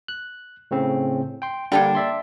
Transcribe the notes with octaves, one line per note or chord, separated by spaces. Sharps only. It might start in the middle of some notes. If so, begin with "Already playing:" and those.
F#6
A2 C#3 C4
G5 C6
D3 G3 A#3 D4 G5
D5 E5 C6